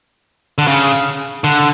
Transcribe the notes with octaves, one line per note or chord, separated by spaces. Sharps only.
D3
C#3
D3